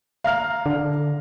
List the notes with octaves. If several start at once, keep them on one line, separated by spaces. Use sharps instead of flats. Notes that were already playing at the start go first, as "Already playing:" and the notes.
F5 A#5 F6
D3